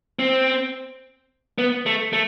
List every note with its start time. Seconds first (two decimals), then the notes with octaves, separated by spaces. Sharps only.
0.19 C4
1.58 B3
1.86 A3
2.13 A3